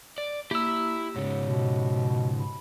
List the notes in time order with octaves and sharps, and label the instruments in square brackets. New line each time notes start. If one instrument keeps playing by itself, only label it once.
[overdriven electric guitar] D5
[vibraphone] A#3 [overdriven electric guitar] E4 [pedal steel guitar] G4 E6
[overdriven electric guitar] G#2 C#3 [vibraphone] C#5
[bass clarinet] B2
[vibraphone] B5